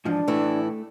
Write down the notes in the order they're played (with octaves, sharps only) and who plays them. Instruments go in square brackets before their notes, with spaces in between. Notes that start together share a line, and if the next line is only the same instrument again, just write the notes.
[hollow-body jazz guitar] G#2 E3 F3 [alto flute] D4
[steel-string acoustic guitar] A2 E3 E4 [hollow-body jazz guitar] A3